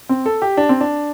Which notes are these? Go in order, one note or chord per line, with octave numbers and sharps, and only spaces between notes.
C4
A4
G4
D4
C4
D4